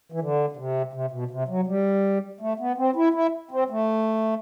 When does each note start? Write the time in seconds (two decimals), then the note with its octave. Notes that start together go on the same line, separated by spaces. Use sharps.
0.12 E3
0.20 D3
0.52 D3
0.57 C3
0.93 C3
1.11 B2
1.31 C3
1.48 F#3
1.67 G3
2.41 A3
2.60 B3
2.78 C4
2.96 E4
3.14 E4
3.51 C4
3.70 A3